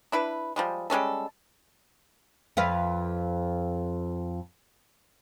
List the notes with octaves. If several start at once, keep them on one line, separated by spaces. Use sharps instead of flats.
D4 E4 B4
F3 G3 G#3
G3 G#3 C#4 A4
F2 B4 F5